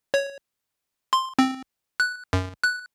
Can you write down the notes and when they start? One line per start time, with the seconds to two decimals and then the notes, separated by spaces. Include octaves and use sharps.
0.14 C#5
1.13 C6
1.39 C4
2.00 F#6
2.33 F#2
2.64 F#6